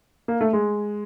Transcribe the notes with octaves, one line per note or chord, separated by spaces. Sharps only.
A#3
A3
G#3